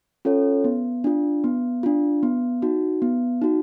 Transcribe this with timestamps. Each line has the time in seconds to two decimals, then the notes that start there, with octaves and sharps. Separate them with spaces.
0.25 C#4 F4 A4 C#5
0.64 B3
1.04 D4 F4
1.44 B3
1.83 D4 F4
2.23 B3
2.62 D#4 F#4
3.02 B3
3.42 D#4 F#4